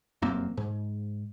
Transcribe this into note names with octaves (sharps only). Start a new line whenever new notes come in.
F1 F#2 A#3 C4
G#2